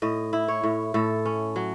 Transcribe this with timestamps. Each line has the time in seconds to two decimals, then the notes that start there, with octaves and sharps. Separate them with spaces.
0.02 A2 D#5
0.33 E4
0.48 C#5
0.63 A2
0.94 A2 A4
1.25 C#4
1.56 F#3